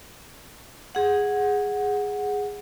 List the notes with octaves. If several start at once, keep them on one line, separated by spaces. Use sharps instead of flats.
G#4 F#5